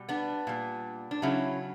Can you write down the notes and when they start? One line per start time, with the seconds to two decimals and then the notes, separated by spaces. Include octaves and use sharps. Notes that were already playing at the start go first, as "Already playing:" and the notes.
Already playing: B2 G3
0.09 B3 D4
0.47 A#2 G3
1.11 D4
1.22 C#3 F#3 C#4 E4